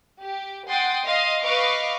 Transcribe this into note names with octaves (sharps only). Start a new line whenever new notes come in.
G4
F#5 G5 C6 D#6 A6
D#5 F5 C6 D#6
B4 D#5 F5 C#6 D6